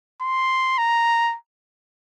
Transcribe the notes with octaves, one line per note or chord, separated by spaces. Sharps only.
C6
A#5